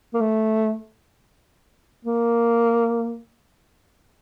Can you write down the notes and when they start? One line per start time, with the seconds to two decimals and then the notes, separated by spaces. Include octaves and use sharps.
0.14 A#3
0.21 A3
2.05 A#3